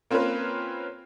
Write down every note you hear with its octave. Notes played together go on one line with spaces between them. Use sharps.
A#3 C4 C#4 F4 A#4 B4